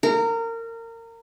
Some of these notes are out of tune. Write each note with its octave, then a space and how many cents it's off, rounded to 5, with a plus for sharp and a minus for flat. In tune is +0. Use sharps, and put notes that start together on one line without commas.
A#4 -25